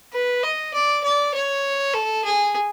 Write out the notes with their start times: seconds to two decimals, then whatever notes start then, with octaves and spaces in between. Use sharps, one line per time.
0.13 B4
0.43 D#5
0.73 D5
1.03 D5
1.34 C#5
1.94 A4
2.24 G#4